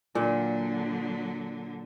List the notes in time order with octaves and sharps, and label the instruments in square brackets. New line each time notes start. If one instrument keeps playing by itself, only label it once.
[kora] A#2 [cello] D3 F#3